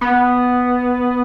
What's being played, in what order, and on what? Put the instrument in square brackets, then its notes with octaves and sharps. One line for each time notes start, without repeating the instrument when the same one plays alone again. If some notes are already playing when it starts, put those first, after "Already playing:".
[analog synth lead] B3